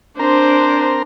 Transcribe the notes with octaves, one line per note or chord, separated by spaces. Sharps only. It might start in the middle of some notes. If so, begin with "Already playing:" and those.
C4 D4 A#4 C5 A#5